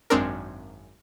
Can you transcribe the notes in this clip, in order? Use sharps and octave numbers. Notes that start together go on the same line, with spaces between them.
G#1 F#2 G#3 C4 D4 A#4